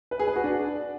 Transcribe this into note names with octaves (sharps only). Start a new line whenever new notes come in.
B4
G#4
B4
F#4
D4